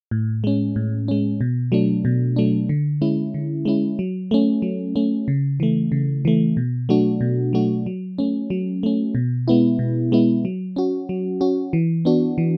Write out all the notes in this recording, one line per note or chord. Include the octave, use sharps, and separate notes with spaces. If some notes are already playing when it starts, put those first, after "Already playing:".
A2
G#3 C#4
A2
G#3 C#4
B2
F#3 A3 D4
B2
F#3 A3 D4
D3
G#3 C#4 E4
D3
G#3 C#4 E4
F#3
A3 C#4
F#3
A3 C#4
C#3
E3 A3
C#3
E3 A3
B2
F#3 A3 D4 F#4
B2
F#3 A3 D4 F#4
F#3
A3 C#4
F#3
A3 C#4
B2
G#3 B3 E4
B2
G#3 B3 E4
F#3
C#4 F#4
F#3
C#4 F#4
E3
B3 D4 F#4
E3